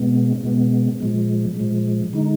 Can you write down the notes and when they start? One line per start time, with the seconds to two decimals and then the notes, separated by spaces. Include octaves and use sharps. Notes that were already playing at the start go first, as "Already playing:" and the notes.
Already playing: B2 G#3 B3
0.44 B2 G#3 B3
1.00 A#2 F3 G#3
1.57 A#2 F3 G#3
2.13 D3 G#3 D#4